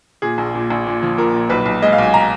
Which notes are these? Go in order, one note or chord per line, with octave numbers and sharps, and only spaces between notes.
A#2 G#4
A#1
A#2
A#1
A#2
F3
A#2 A#4
A#2
B1 B4
B1
G#3 D#5
F5
B1 G#5
A#5